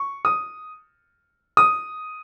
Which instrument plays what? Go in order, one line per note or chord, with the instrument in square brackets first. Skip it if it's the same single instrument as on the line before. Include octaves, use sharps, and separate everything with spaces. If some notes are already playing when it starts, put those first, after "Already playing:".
Already playing: [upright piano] C#6
D#6
D#6